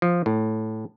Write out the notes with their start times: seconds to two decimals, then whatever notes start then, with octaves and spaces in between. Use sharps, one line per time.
0.02 F3
0.26 A2